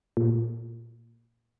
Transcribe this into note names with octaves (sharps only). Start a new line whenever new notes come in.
A#2